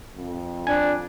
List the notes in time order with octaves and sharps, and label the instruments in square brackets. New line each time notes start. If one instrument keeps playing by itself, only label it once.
[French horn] F2
[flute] D4 [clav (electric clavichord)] G#5